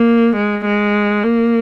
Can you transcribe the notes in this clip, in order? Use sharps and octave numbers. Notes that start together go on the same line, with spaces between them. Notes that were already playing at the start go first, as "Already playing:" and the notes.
Already playing: A#3
G#3
G#3
A#3